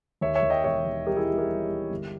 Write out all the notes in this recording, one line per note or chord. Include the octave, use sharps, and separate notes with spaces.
D#2 C#5 E5
C#5 E5
D#2
D#5 G5
E1 C#5 E5
D#2
G3 G4 A#4
E4 G#4
G3
G4 A#4
G3
G3
G1